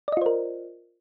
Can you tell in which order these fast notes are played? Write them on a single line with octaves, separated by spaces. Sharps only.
D5 D#5 F4 C5 A#4